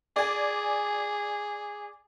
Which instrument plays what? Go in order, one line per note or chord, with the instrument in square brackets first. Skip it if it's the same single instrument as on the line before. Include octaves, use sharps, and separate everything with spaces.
[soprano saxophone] G#4 [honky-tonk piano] D5 G#5